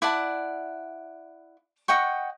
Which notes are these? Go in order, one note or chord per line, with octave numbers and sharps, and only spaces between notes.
E4 D5 F#5 A5
D#5 F#5 G5 C#6